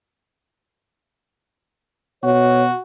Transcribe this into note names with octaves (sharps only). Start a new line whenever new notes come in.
B2 F#4 C#5